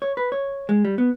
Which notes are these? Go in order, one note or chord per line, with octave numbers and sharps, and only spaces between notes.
C#5
B4
C#5
G#3
G3
B3